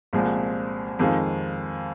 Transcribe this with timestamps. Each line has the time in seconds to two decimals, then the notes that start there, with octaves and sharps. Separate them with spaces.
0.13 C2 A#2 F3 G#3 C4
0.99 F2 D#3 G#3 C4 F4